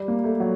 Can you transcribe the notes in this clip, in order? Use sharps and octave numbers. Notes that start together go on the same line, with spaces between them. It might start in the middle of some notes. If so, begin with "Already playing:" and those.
Already playing: G3
A#3
A3
F#3